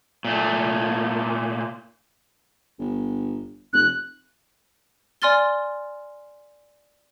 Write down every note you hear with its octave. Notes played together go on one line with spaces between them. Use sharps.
A#2 A3
G1
F1 F#6
D5 G#5 C6 F6 A6 G7